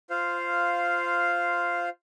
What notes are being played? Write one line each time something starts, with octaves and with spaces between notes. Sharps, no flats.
F4 C5 F5